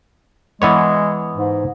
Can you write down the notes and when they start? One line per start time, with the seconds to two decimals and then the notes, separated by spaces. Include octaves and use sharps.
0.62 E3 G#3 B3 C#5
1.34 G#2